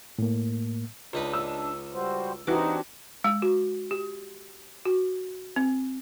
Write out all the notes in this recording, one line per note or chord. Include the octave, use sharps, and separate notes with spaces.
A2 A#3
C#2 D4 D#4 B4
E6
G3 F#4 C5
E3 C4 D4 D#4 F#4 G4 D6
G#3
F#4
G4
F#4
C4